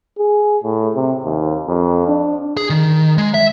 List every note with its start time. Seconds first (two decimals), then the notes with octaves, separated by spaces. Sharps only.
0.18 G#4
0.64 A2
0.94 C3
1.24 D#2
1.68 F2
2.08 D4
2.57 G#4
2.70 D#3
3.18 G#3
3.34 E5